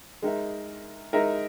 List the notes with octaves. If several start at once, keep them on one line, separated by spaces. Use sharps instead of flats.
G#3 D#4 A#4 E5
G#3 D#4 A#4 E5